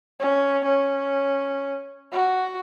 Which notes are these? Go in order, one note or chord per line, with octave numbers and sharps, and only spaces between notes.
C#4
C#4
F#4